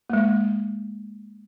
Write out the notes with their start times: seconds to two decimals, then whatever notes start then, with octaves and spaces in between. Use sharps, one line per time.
0.10 G#3 A#3